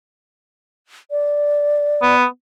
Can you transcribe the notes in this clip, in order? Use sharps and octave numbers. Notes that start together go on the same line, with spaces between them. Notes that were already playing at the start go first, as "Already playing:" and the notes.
D5
B3